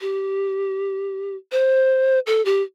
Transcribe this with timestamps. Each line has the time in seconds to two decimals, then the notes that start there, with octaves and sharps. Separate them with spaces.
0.01 G4
1.52 C5
2.27 A4
2.45 G4